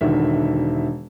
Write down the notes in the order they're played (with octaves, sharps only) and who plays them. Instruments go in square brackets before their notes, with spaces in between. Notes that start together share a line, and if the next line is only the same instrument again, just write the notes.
[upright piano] E1 D3 D#3 E5